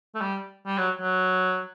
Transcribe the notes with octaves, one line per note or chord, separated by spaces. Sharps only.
A3
G3
G3
F#3
F#3